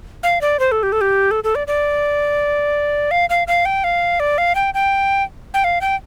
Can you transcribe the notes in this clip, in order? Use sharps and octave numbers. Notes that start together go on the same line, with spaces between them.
F5
D5
C5
A4
G4
A4
G4
A4
A4
D5
D5
F5
F5
F5
G5
F5
D5
F5
G5
G5
G5
F5
G5